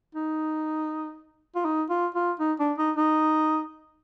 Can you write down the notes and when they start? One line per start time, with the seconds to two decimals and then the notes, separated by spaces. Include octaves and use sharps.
0.15 D#4
1.56 F4
1.65 D#4
1.90 F4
2.15 F4
2.40 D#4
2.59 D4
2.78 D#4
2.97 D#4